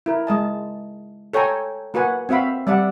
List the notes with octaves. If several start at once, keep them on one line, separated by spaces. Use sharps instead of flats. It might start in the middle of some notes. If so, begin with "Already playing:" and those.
E4 A#4
G#3 D#5 A5
A4 C#5 G5 G#5 A#5
A#3 F#4 B4 F#5 G#5
C4 F#4 E5 F5 B5
G3 D5 E5 F#5